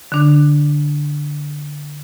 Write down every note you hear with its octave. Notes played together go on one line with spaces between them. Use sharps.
D3 D4